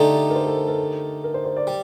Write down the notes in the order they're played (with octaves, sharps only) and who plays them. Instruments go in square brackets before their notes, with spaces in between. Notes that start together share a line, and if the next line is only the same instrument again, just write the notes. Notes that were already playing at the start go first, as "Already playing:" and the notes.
Already playing: [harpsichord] D3 A3 D#4 G4 [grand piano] D5
[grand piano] A#4
C5
A4
A#4
A#4
A#4
C5
C5
D5
[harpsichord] G3